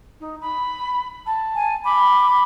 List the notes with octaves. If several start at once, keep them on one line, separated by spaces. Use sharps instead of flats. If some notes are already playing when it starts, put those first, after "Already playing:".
D#4
B5
A5
G#5
B5 D6